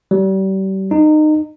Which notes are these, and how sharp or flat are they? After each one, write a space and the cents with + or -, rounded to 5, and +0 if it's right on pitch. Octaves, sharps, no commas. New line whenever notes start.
G3 -35
D#4 -25